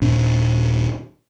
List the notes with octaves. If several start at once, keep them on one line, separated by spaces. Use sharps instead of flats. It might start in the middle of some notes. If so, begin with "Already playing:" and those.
D#1 A#2 D4